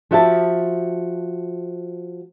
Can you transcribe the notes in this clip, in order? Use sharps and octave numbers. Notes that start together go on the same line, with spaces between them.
F3 F#4 G4 E5 G5 A5